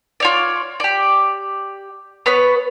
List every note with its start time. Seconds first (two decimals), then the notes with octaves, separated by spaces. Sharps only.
0.20 F4 C#5 D5
0.80 G4 D5
2.26 B3 B4 C#5